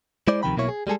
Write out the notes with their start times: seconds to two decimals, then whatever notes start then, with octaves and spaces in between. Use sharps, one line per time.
0.28 G#3 E4 C5 D5
0.43 D2 C3 D#3 F3 G5 B5
0.56 B1 B2 A#3 E4 C#5
0.69 G#4
0.87 G3 G#3 G#4 A4